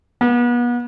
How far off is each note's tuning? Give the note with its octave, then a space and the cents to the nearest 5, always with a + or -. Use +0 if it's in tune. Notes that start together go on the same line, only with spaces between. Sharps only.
B3 -35